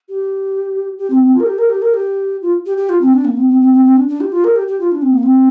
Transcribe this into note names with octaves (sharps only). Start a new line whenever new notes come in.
G4
G4
C4
C4
F4
A#4
G4
A#4
G4
A#4
G4
F4
G4
G4
F4
C4
D4
A#3
C4
C4
C4
C4
C4
D4
D4
G4
F4
A#4
G4
G4
F4
D4
C4
A#3
C4